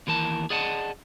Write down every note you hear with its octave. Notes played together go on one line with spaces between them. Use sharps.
D#2 E3 A#4 A5
G#4 D5 D#5 F#5 A5